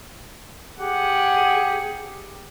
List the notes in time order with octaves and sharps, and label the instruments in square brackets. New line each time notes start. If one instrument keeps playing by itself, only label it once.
[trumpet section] G4 G#4 [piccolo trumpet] F#5